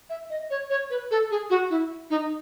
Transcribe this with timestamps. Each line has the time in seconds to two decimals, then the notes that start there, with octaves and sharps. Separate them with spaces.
0.10 E5
0.30 D#5
0.50 C#5
0.70 C#5
0.90 B4
1.11 A4
1.31 G#4
1.50 F#4
1.70 E4
2.10 D#4